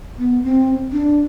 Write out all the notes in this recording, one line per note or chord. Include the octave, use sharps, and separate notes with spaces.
B3
C4
D4